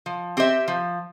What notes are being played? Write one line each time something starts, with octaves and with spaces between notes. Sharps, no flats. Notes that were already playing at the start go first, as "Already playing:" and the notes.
F3
C4 G4 C5 E5
F3